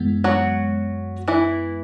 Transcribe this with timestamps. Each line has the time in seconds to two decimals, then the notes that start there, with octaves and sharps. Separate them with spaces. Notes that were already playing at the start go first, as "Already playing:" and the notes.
Already playing: F#2 E3 G#3 B3
0.24 F#3 F#4
1.28 E3 E4